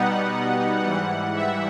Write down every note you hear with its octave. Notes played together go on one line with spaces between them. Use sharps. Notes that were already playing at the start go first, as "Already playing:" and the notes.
Already playing: B2 G3 B3 D#4 F#5
G#2 E3 G3 F#5
E5